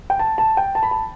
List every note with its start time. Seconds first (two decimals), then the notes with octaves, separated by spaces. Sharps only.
0.10 G5
0.19 A5
0.38 A5
0.57 G5
0.75 A5
0.83 B5
0.91 A5